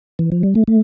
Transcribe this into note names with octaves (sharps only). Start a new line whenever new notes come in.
E3
F3
G3
A3
A3